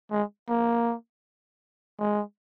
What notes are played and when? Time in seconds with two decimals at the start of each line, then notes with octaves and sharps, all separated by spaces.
0.11 G#3
0.49 A#3
1.99 G#3